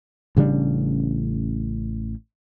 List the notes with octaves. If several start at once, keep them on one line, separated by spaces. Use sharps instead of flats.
A1 C#3 G3 D4